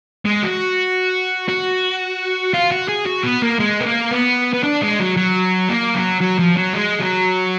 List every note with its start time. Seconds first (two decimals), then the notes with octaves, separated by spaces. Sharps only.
0.25 G#3
0.43 F#4
1.48 F#4
2.54 F4
2.72 F#4
2.89 G#4
3.06 F#4
3.23 B3
3.42 A#3
3.59 G#3
3.80 B3
3.85 A#3
4.11 B3
4.54 B3
4.63 D4
4.82 G#3
5.00 F#3
5.17 F#3
5.69 A#3
5.95 F#3
6.21 F#3
6.39 F3
6.57 F#3
6.75 G#3
7.00 F#3